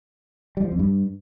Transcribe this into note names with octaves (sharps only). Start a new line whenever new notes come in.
G3
F3
F2
G2